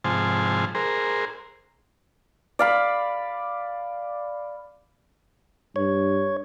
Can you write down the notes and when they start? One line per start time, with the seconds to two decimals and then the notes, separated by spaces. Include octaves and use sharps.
0.04 G#2 C3 F3 C5 G#5 A5
0.75 G#4 A#4 C5
2.59 D5 F5 B5
5.76 G2 C#5